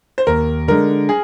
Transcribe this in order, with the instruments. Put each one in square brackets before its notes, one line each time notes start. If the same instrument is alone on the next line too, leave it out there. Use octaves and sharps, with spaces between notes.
[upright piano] C5
[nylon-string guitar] D#2 [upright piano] A#4
[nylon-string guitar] D3 G#3 [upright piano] A#4
[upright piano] G#4